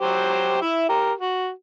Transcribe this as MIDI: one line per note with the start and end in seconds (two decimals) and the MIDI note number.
0.01 0.57 54
0.01 0.57 67
0.01 0.57 72
0.61 0.85 64
0.61 0.85 76
0.89 1.12 67
0.89 1.12 70
1.18 1.49 66